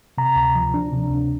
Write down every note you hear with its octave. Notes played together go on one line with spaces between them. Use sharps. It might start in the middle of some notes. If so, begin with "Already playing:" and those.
C3 A#5
D2
F3
D4
C3
D2